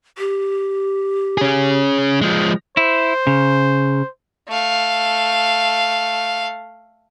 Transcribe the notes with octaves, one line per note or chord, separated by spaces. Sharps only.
G4
C#4 G#4
F3 G#3
E4 C5
C#3
A3 F5